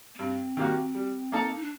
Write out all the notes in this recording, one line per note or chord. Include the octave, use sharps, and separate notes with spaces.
A#3
G2 C4
D#3 G3 A#3 F#4
G3
A#3 D#4 A4
D#4
D4